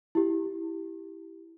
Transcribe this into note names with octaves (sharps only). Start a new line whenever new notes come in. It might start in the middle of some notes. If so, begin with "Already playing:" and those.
E4 G4